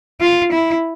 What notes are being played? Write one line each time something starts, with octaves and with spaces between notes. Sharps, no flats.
F4
E4